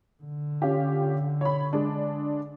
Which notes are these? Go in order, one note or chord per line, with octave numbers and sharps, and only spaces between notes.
D3
C#4 F4 G4
C#5 B5
G#3 D4